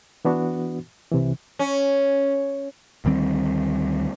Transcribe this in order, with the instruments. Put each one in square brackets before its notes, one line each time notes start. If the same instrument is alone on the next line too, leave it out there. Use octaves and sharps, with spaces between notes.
[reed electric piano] E3 B3 D4 F#4
C2 C3 E3
[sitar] C#4
[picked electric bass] D2 D#3 G3 C4